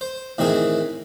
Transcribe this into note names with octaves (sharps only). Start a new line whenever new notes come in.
C5
A2 D#3 E3 C4 G#4